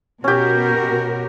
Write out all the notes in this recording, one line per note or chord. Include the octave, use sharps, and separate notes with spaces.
B2 C#4 F#4 G4 A#4